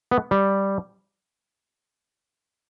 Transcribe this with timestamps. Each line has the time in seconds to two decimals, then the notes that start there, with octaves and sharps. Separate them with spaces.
0.11 B3
0.31 G3